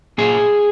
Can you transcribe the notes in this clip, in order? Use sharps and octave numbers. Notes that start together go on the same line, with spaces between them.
A#2 G#4